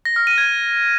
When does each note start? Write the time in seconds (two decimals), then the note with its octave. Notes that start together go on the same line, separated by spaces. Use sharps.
0.05 A#6
0.16 F6
0.27 D#7
0.38 G#6